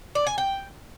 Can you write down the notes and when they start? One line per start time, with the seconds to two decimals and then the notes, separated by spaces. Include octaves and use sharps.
0.15 D5
0.27 G#5
0.38 G5